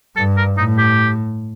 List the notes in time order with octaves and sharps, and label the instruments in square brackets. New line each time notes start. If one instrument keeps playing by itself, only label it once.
[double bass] G2 [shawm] A4
[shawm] A#4
[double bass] A2 [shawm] D#4
[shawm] G4